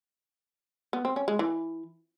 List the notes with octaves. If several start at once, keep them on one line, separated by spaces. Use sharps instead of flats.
B3
C4
C#4
G#3
E3